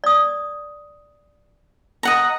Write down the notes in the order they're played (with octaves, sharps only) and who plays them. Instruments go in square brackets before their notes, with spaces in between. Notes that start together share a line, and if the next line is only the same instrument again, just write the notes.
[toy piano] D5 D#6
[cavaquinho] D#5 F#5 A#5